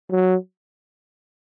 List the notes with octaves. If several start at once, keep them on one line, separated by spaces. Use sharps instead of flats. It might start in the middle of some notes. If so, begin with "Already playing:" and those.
F#3